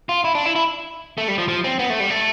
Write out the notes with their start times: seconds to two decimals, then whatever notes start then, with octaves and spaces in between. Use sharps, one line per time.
0.09 F4
0.24 E4
0.35 D4
0.45 E4
0.56 E4
1.18 A3
1.28 G3
1.38 F3
1.49 F3
1.64 C4
1.79 B3
1.90 A3
2.00 G3
2.10 A3